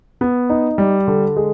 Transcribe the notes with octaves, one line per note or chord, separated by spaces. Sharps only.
B3
D#4
G3
D3
G#3